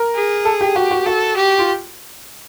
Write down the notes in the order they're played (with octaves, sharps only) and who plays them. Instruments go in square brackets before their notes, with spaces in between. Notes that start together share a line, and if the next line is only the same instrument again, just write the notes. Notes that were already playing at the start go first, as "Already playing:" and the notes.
Already playing: [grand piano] A#4
[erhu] G#4
[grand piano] A4
G4
[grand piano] F#4 [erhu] G4
[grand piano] F#4
[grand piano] F#4 [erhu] A4
[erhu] G4
[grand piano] F4